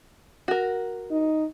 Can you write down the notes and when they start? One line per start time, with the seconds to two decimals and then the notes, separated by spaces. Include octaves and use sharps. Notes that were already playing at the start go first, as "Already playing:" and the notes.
0.48 F#4 A#4
1.11 D#4